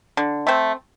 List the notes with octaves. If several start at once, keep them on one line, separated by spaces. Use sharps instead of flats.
D3
A3 C4